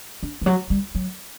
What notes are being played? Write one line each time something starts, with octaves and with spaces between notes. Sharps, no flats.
D4
E3
F#3
G3
F#3